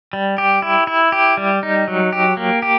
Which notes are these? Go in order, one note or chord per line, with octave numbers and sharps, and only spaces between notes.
G3
G4
E4
E4
G4
G3
D#4
F#3
G4
A#3
G4